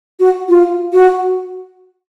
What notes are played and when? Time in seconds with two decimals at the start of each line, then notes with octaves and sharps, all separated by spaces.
0.20 F#4
0.49 F4
0.93 F#4